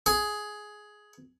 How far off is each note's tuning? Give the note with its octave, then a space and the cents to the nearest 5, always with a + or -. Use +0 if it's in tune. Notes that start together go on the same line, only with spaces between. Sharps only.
G#4 +10